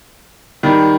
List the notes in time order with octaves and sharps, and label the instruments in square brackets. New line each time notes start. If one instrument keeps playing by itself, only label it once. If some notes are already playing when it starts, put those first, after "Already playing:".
[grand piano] D#3 G3